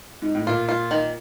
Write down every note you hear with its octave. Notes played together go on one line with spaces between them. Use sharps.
G#2
A2
A#2 F4
F4
D#3